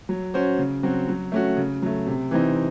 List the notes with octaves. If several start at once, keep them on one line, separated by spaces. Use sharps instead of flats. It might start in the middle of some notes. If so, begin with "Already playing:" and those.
F#3
C#4 F#4 C5
C#3
F#3 C4 F#4
F#3
A3 C#4 F#4
C#3
F#3 A3
C3
E3 C4 D#4